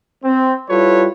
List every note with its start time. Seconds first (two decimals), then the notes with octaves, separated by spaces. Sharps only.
0.24 C4
0.70 G3 E4 F4 A4 B4 C#5